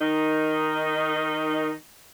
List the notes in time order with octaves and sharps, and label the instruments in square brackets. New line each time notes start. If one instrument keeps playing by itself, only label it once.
[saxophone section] D#3 D#4